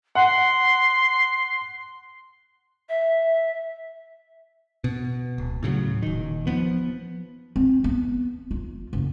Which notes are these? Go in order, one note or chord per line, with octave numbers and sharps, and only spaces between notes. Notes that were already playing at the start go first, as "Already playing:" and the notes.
F#5 C6
E5
B2
D1
A2 C#3 E3 F#3
D#1 D#3
F3 B3
C4
B3
F4
F#1